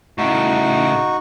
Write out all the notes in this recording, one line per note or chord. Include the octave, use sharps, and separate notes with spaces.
A2 C#3 D#4 F#4 C#6